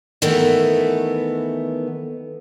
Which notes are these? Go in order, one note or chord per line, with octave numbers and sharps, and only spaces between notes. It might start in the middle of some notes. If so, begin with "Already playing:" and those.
D#3 E3 A3 B3